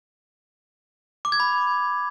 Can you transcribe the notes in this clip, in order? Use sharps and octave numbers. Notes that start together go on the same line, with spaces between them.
D6
G#6
B5